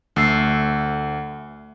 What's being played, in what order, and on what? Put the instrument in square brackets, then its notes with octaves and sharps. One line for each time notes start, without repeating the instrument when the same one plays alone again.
[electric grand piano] D2 [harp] A3 E6 C7